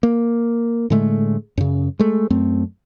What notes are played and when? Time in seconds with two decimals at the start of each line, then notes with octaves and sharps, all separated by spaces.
0.03 A#3
0.90 A2 D3 G#3 A3
1.57 F#2 C#3
1.99 G#3 A3
2.30 F#2 A3 C4